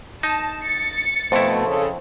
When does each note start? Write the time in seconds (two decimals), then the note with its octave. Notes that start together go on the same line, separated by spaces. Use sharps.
0.23 D#4 A5 A#6
0.65 A6 C#7
1.32 F2 B2 A3 E4 C5 C6 C#6
1.66 C#3 A4